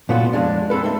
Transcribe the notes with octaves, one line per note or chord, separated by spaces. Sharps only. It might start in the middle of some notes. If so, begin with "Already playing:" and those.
A#2 A3 B3 F4 F#4
F2 G#3 D4
C4 G#4 A4 B4
A3 D#4